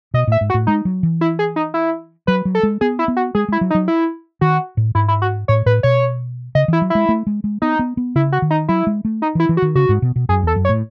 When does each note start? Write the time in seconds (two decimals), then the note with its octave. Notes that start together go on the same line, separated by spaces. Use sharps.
0.14 B2 D#5
0.27 A2 E5
0.41 G#2
0.50 F#4
0.54 A2
0.67 G#3 D#4
0.85 F#3
1.03 E3
1.21 E4
1.39 G#4
1.56 D#4
1.74 E4
2.27 F#3 B4
2.45 F#3
2.55 A4
2.63 G#3
2.81 B3 G#4
2.99 E4
3.08 B3
3.17 F#4
3.35 G#3 G#4
3.48 G#3 E4
3.61 F#3
3.70 D#4
3.75 F#3
3.88 E4
4.41 D#3 F#4
4.77 A2
4.95 G#2 E4
5.08 E4
5.22 F#4
5.48 A2 C#5
5.66 A2 B4
5.83 B2 C#5
6.55 C#3 D#5
6.68 E3 E4
6.82 F#3
6.90 G#3 E4
7.09 A3
7.27 G#3
7.44 G#3
7.62 B3 D#4
7.79 B3
7.97 B3
8.15 C#3 E4
8.32 F#4
8.42 D#3
8.51 D#4
8.68 F#3 E4
8.87 G#3
9.05 A3
9.22 D#4
9.35 E3 E4
9.49 E3
9.57 F#4
9.62 D#3
9.75 C#3 F#4
9.89 G#2
10.02 B2
10.16 B2
10.29 F#2 G#4
10.43 E2 A4
10.56 F#2
10.65 C#5
10.69 A2